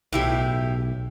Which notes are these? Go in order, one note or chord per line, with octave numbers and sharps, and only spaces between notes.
B1 A2 E4 G4